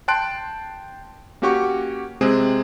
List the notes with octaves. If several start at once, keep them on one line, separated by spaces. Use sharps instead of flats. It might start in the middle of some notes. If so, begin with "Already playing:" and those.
G5 A5 C6 F#6 D7
A#3 C#4 F#4 G4 F#5 C#6
C3 G#3 C4 G#4